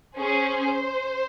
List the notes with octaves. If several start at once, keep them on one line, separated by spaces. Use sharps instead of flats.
C#4 G#4 C5